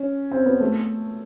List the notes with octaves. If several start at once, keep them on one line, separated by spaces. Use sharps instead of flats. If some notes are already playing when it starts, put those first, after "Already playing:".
Already playing: C#4
C4
B3
A3